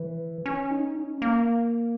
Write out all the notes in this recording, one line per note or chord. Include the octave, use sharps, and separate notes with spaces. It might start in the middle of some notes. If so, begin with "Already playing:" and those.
Already playing: E3
C#4
D#4
C#4
A#3